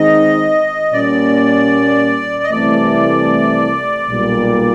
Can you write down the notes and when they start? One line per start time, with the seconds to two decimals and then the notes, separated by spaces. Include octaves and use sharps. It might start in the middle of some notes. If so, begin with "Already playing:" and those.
Already playing: D#3 G#3 C4 D#4 D#5
0.93 A#2 G3 A#3 C#4 D5
2.43 D#5
2.51 C2 C3 E3 A3 D5
4.09 B1 A#2 G3